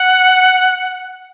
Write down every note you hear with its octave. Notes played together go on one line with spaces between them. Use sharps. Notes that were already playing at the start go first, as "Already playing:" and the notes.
Already playing: F#5